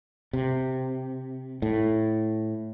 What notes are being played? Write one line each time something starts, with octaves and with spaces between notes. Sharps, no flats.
C3
A2